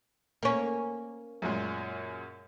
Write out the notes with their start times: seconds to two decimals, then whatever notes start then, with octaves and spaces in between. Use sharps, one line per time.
0.43 A#3 C#4
1.42 F#2 A#2 G#3